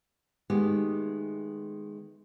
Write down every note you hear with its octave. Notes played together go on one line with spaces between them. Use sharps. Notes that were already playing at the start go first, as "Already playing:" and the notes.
D#3 G#3 A3 B3 G4